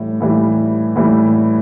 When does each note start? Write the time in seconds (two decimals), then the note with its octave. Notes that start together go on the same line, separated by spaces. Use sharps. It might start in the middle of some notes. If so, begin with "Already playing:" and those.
Already playing: A2 E3 G3
0.20 A2 E3 G3
0.96 A2 E3 G3